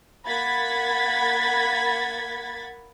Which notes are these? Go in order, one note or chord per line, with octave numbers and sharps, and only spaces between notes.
A#3 F#5 B5 G#6 A6 B6